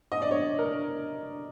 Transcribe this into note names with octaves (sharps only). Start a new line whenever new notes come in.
D#5
D5
C#5
A#4